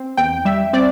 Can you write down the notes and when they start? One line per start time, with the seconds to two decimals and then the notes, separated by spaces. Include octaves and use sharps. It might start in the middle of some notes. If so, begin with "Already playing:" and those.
Already playing: C4
0.17 E2 G5
0.45 G3 E5
0.73 C4 D5